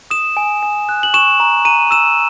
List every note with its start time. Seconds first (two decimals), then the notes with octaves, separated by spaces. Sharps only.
0.11 D#6 E7
0.37 G#5
0.63 G#5
0.89 F#6
1.03 F#7
1.14 C#6 E7
1.40 A#5
1.65 A#5 D#7
1.91 E6 E7